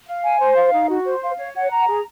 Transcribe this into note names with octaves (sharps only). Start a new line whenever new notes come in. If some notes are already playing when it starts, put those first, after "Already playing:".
F5
G#5
C5
F5
D#4
F#4
C5
F5
C#5
F#5
A#5
G#4